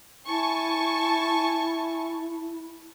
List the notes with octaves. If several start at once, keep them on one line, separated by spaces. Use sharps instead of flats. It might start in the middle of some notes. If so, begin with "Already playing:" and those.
E4 G#5 A5 C#6